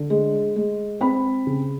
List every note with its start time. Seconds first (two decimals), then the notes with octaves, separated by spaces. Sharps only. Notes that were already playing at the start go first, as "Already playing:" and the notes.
Already playing: D3
0.10 G#3
0.56 G#3
1.01 C4 B5
1.47 C#3